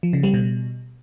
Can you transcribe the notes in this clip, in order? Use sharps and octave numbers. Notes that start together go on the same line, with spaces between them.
F3
C#3
G3
B2